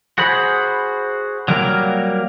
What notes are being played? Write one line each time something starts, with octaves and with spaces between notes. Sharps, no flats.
F#4 G#4 C5 B5
F#3 G3 A#3 A#4 A#5